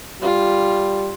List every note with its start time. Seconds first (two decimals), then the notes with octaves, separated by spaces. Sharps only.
0.22 G3 F4